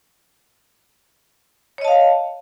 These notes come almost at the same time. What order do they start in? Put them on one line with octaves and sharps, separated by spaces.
C#5 D#5 A5 F5